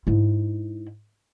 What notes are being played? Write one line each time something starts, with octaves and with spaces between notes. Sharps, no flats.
G#2 E4